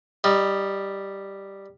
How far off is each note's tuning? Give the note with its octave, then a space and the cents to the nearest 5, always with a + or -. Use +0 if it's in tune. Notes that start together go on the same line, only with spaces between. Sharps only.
G3 +0 D#4 -15